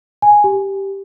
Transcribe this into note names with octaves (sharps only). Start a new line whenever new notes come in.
G#5
G4